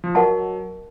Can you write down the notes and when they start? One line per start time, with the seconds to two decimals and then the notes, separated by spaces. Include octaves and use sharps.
0.04 F3
0.15 F#3 A#4 D#5 F#5 A5